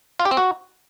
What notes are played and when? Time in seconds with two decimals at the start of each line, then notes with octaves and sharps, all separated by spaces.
0.20 F4
0.25 G4
0.31 C4
0.37 F#4